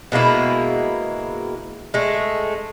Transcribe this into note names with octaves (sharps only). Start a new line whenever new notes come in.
B2 G#3 A#3 E4
G#3 A3